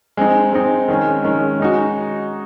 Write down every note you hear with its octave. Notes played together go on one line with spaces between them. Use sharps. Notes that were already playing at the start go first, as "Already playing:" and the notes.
G#3 C4 D#4
G#3 C4 D#4
D#3 G#3 C#4
D#3 G#3 C#4
G#3 D#4 F#4